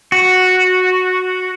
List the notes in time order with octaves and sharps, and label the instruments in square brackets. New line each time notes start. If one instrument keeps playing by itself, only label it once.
[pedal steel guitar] F#4